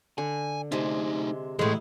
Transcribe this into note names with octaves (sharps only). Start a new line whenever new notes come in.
D3 G#5
C3 G#3 A3 D#4
A2 E3 G#3 D#4 E4 G#4